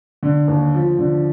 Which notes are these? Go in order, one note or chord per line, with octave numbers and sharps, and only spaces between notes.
D3
D#2
F3
D3